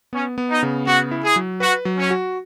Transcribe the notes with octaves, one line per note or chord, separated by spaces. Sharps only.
B3 C#4
B3
D#4
C#3
B3 F#4
E4
G#4
F#3
F#4 B4
F#3
C#4
F#4